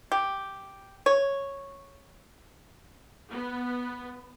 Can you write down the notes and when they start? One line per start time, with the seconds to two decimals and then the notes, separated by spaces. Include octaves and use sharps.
0.12 G4
1.06 C#5
3.31 B3